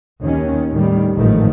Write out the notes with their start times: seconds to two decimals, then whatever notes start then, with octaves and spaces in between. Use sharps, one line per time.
0.23 D#2 D#3 C#4
0.71 A2 D#3 G3
1.14 A1 G#2 D#3 F3 A3